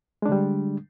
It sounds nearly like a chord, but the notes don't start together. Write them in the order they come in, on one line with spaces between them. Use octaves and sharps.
G#3 D4 D3 G3